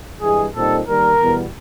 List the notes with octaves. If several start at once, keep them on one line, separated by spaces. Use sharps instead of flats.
G2 E3 G#3 G#4
A#2 G3 C4 D#4 A4
D#3 G3 A#3 A#4
E2 B2 G3 B3